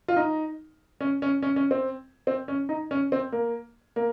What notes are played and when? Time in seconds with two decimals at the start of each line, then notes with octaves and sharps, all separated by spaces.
0.08 F4
0.16 D#4
1.01 C#4
1.22 C#4
1.43 C#4
1.56 C#4
1.71 C4
2.27 C4
2.48 C#4
2.69 D#4
2.91 C#4
3.12 C4
3.32 A#3
3.96 A#3